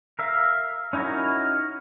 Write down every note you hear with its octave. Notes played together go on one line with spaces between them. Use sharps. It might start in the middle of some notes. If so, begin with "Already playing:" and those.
A#4 E5 F5
C#4 D#4 E4 F#4 A#4